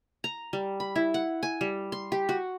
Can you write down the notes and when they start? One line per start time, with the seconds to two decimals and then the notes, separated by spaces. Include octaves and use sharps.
0.24 A#5
0.53 G3
0.80 B5
0.96 E4
1.14 F#5
1.43 G#5
1.61 G3
1.92 C6
2.12 G4
2.29 F#4